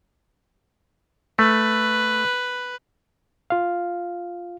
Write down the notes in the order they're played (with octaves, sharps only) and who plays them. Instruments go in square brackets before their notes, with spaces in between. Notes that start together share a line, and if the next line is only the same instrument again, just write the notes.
[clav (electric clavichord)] A3 [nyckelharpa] B4
[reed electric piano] F4 F5